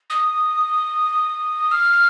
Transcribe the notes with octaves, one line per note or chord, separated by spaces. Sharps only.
D#6
F6